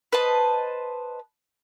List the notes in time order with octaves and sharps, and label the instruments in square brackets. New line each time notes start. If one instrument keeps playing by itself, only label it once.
[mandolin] B4 C5 D#5 A5